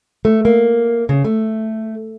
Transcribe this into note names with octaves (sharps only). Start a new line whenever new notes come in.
A3
A#3
C#3
A3